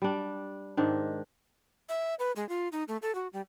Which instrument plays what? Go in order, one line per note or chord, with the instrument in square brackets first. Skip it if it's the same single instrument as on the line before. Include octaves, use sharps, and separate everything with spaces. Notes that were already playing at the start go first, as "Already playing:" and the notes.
[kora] G3 D4
G#2 D#3 D4
[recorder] E5
B4
G#3
F4
D#4
A3
A4
F#4
G3